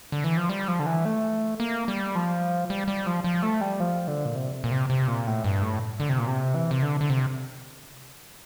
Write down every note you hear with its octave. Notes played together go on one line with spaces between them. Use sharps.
D3
E3
F3
G3
F3
D3
E3
A3
A#3
G3
F3
G3
G3
F3
F3
A3
G3
F3
D3
A#2
C3
A#2
C3
C3
A#2
A2
G2
A2
D3
C3
A#2
C3
E3
C3
D3
D3
C3